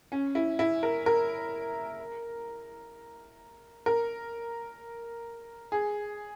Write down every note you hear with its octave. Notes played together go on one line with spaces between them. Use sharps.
C#4
E4
E4
A#4
A#4
A#4
G#4